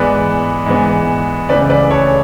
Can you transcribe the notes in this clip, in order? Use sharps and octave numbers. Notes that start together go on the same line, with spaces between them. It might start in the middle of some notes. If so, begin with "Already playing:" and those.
Already playing: G#2 E3 B3 B4 D5
G#2 E3 B3
C#2 C#3 E3 A3 B4 D5
B4 D5
A4 C#5